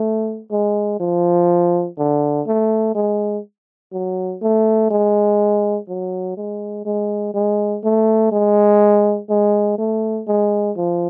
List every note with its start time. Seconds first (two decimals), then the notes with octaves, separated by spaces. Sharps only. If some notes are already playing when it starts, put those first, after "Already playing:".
Already playing: A3
0.51 G#3
1.00 F3
1.98 D3
2.47 A3
2.95 G#3
3.93 F#3
4.42 A3
4.91 G#3
5.88 F#3
6.37 G#3
6.85 G#3
7.34 G#3
7.84 A3
8.32 G#3
9.30 G#3
9.78 A3
10.27 G#3
10.77 F3